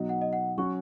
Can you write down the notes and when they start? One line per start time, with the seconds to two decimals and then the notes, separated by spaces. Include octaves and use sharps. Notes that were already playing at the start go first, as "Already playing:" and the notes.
Already playing: B2 F#3 D#4 F#4
0.09 F#5
0.22 D#5
0.33 F#5
0.57 F#3 C#4 F#4 C#6